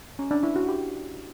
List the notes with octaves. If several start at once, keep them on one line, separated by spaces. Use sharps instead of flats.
C#4
D4
E4
F#4
G4